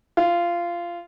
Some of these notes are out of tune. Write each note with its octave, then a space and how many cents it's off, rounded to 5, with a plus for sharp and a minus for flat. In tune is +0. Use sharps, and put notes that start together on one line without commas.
F4 -15